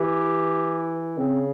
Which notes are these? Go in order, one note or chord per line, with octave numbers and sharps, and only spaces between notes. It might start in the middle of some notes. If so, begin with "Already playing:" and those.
Already playing: E3 G4
C#3 C4